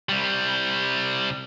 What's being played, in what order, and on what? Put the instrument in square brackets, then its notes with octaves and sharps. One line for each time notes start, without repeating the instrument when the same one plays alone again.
[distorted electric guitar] C2 G3